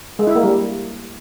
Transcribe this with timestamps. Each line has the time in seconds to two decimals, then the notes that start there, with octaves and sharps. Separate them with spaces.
0.19 G#3
0.27 E4
0.35 A#3
0.43 G3